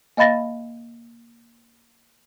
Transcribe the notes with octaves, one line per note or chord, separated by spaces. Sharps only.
A#3 D#5 F5 B5 A6 A#6